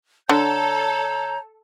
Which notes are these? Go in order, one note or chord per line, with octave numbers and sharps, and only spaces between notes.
D3 A4 C#5 A#5 G6